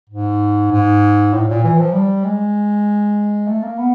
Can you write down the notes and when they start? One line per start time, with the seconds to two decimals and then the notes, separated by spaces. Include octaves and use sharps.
0.09 G#2
0.71 G#2
1.33 A2
1.48 A#2
1.64 E3
1.78 F3
1.93 G3
2.24 G#3
3.48 A3
3.63 A#3
3.78 B3